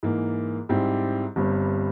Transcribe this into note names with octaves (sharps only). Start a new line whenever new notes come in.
G#2 E3 A#3
G#2 G3 C4 E4 G4
G1 G2 G3 C4